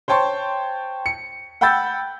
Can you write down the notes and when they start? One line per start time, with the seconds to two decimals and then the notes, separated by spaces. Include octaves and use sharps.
0.08 C5 C#5 G5 A5 C6 C#6
1.06 C#7
1.61 F#5 G5 B5 E6 G6 A6